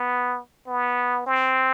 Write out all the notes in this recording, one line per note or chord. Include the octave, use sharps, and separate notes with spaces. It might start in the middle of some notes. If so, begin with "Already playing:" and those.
Already playing: B3
B3
C4